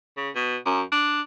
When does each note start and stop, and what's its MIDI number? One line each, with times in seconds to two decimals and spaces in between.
0.17 0.30 49
0.35 0.57 47
0.66 0.82 42
0.92 1.21 62